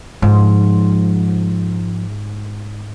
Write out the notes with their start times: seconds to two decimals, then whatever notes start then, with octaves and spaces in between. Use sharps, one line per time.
0.22 G#2 F3